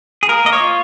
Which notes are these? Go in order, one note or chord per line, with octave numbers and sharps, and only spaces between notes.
G#4
A#3 A#4
A#3 D#5
C#5
F4